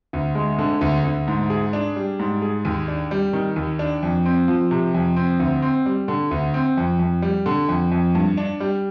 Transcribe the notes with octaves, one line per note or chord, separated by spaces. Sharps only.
D2
G#3
D3
D2
D2
G#2
G#4
D4
G3
G#2
G#4
D#2
D4
G3
D#3
D#2
D4
F2
C4
F3
C3
F2
C4
D2
C4
G3
D3
D2
C4
F2
F2
G3
D3
F2
F2
G2
D4
G3